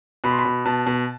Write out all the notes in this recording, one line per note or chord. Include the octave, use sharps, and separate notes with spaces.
B2 B5
C6
B5
B2
B2 A5
B2